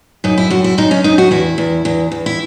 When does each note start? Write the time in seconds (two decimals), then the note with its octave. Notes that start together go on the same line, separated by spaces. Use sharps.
0.24 F#2 D#4
0.38 E4
0.50 F#2 F#4
0.64 E4
0.78 F#2 D#4
0.91 C#4
1.04 F#2 D#4
1.18 F#4
1.31 E2 E4
1.58 E2
1.85 E2
2.11 E2
2.26 E4